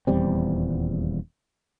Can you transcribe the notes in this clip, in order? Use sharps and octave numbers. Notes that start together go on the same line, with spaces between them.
D#1 E2 G3 C4